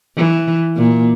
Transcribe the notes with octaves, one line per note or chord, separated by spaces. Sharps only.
E3
A#2